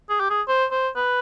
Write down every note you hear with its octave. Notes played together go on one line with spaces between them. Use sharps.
G#4
G4
G#4
C5
C5
B4